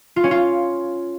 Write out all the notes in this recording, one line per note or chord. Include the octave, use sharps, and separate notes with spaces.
F4
C#4
F4